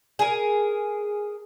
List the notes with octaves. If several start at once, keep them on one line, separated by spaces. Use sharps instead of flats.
G#4 A#4